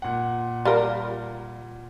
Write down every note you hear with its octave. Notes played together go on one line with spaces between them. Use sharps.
A#2 F#5
G3 F4 A#4